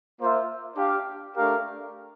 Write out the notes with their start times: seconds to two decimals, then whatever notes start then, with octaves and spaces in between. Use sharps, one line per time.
0.18 A#3 F4 C5 E5
0.76 D4 G4 D5 F5
1.35 A3 D4 G4 A#4 F5